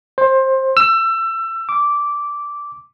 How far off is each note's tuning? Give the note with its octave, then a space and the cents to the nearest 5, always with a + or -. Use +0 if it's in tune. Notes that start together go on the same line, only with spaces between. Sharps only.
C5 +20
E6 +25
D6 -10